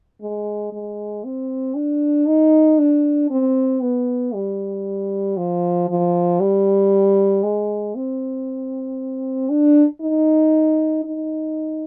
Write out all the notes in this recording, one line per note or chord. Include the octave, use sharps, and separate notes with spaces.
G#3
G#3
C4
D4
D#4
D4
C4
B3
G3
F3
F3
G3
G#3
C4
D4
D#4
D#4